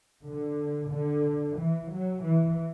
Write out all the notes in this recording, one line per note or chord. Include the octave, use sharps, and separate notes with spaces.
D3
D3
E3
F#3
E3